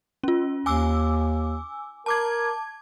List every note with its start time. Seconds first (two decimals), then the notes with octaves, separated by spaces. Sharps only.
0.24 C#4 F4
0.66 D#2 G#5 D6 E6
2.06 A#4 A5 D6 G#6